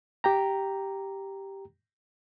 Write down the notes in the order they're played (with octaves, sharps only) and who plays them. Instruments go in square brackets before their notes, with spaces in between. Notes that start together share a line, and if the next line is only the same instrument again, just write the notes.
[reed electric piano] G4 G5 A#5